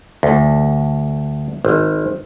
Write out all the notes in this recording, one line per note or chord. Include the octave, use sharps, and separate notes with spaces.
D2
G#1